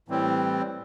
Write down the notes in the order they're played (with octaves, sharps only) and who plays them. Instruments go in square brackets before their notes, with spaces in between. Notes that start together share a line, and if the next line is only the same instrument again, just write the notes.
[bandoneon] A2 E3 G3 C4